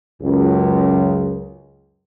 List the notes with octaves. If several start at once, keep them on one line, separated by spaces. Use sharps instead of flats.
C#2 F#2